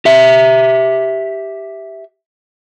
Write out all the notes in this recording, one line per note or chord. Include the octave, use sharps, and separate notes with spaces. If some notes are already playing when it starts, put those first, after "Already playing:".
G4 E5